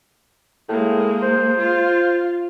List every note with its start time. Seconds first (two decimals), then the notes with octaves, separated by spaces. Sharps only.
0.69 A2 G#3 A#3
1.22 C5
1.58 F4